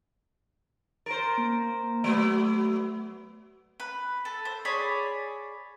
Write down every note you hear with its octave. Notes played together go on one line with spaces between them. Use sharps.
A#4 C5 A6
A#3
F#3 A3 B3
B4
A4
C5
G#4 C#5 D5 B5